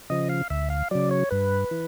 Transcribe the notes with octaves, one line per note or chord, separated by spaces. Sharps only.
C#3 F3 D#5
F5
D2 E5
F5
C#3 F#3 D5
C#5
G2 B4
E3